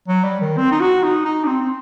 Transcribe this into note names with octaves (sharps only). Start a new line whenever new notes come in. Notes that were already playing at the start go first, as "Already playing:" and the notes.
F#3
G3
D#3
C4
D#4
F#4
D#4
D#4
D4
C4
C4